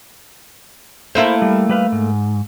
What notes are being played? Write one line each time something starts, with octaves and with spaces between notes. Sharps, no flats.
A3 A#3 E4 C5
G3
G3 B4 F5
G#2